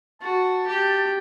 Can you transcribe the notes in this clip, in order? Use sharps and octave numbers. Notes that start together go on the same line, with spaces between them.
F#4 A5
G4